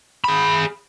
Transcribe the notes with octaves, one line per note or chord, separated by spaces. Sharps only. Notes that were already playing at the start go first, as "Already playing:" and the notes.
G#4 B5